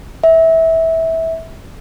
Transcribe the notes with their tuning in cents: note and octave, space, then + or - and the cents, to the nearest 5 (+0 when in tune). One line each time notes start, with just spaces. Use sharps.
E5 -20